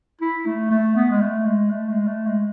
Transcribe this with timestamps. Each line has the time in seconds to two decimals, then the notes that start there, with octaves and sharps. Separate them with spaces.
0.21 E4
0.46 A3
0.71 A3
0.96 B3
1.10 G#3
1.21 A3
1.46 G#3
1.71 A3
1.89 G#3
2.07 A3
2.27 G#3